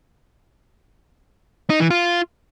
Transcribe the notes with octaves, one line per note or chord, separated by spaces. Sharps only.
D#4
E3
F4